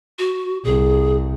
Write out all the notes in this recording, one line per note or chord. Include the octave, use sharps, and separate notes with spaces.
F#4
C2 G#4